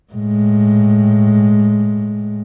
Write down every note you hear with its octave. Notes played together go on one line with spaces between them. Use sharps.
A2 G#3